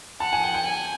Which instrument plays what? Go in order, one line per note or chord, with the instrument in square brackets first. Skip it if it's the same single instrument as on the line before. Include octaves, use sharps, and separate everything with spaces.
[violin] F#5 [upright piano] A5
[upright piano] G#5
G5
G5
[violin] G#5